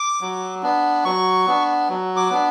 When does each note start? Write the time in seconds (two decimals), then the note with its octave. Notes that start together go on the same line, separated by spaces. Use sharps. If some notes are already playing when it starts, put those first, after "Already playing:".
Already playing: D6
0.21 F#3
0.63 B3 D4
1.05 F#3 C#6
1.47 B3 D4
1.89 F#3
2.17 D6
2.30 B3 D4